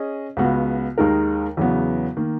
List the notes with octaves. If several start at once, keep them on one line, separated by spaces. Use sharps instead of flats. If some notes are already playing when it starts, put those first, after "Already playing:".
Already playing: C#4 G#4 D#5
C#2 C#3 G#3 B3 F#4
D#2 D#3 G#3 D#4 A#4
E2 C#3 F#3 B3
D#3 A#3